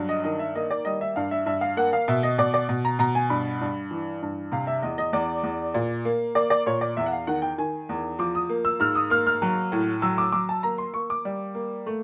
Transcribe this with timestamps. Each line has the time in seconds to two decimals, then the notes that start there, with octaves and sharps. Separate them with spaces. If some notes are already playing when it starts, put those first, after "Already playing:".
Already playing: G2 F#3
0.09 D#5
0.24 D#3 D#5
0.39 E5
0.55 A#3 D#5
0.71 D5
0.85 G3 D#5
1.01 E5
1.16 G2 F5
1.31 E5
1.46 G2 E5
1.61 F5
1.77 A#3 F#5
1.93 F5
2.08 B2 E5
2.23 D#5
2.38 B2 D5
2.54 D5
2.69 B2
2.85 A#5
2.99 B2 A#5
3.15 G#5
3.30 G2 B5
3.61 G2
3.91 E3
4.22 G2
4.52 C3 F5
4.67 E5
4.82 E2 D#5
4.98 D#5
5.13 E2 D5
5.43 E2
5.74 A#2
6.05 A#3
6.35 A#3 D5
6.50 D5
6.66 A#2 C#5
6.81 D5
6.97 E2 E5
7.06 F#5
7.12 F5
7.27 D#3 F#5
7.42 G5
7.58 D#3 G#5
7.89 E2
8.19 F3 D6
8.35 D#6
8.49 A#3
8.65 E6
8.80 G#2 F6
8.95 D#6
9.10 A#3 F6
9.27 F6
9.42 F#3
9.72 A2
10.02 F#3 E6
10.18 D6
10.32 F#3 D6
10.49 A5
10.63 A#3 A#5
10.78 C6
10.94 A#3 C#6
11.10 D6
11.25 G3
11.55 A#3
11.86 A3